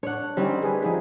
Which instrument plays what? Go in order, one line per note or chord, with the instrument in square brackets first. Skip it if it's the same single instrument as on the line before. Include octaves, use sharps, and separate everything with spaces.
[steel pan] D4 [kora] C#5 F#5
[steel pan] D3 C#4 D#4 [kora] G3 C4
[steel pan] G#4 B4
F3 D#4 G#4